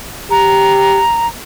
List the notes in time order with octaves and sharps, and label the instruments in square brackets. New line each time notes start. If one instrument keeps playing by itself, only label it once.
[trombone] G4 [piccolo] A#5